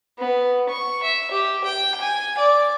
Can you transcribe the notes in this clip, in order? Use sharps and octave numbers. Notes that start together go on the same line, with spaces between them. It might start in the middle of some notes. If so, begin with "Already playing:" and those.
B3
C#6
E5
G4
G5
G#5
D5